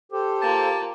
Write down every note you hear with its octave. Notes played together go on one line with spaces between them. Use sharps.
G4 A4 C5
A#3 F4 A5